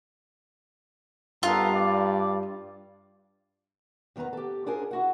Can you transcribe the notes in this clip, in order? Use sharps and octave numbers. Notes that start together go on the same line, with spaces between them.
G2 B3 F4 A4 A#4
D5
E2 D#3 B3 B4 A#5
G4 A4
D4 F4 G#4 A#4 C5 G#5
E4 F#4 F#5